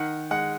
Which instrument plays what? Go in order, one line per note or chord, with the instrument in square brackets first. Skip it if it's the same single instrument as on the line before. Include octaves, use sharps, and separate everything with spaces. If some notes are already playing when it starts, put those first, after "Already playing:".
Already playing: [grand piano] D#3 F#5
G#3 F#5